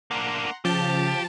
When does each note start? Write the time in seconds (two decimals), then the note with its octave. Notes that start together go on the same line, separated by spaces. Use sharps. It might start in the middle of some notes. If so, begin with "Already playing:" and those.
0.11 A#3 D4 F#5 A#5 C6
0.65 C#3 F3 G4 A5